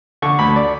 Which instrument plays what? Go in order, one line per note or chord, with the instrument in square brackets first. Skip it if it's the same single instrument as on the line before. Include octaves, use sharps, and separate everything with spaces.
[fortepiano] D3 C#6
D2 B5
D5